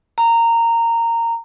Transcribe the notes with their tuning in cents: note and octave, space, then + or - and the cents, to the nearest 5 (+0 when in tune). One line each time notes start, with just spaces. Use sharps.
A#5 -15